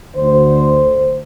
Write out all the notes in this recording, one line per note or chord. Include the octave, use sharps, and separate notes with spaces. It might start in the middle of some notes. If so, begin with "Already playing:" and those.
D2 D3 C5